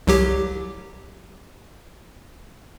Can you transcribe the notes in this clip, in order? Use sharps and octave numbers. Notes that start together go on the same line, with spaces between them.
C2 F#3 G4